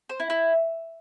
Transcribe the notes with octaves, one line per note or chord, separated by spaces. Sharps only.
C5
E4
E4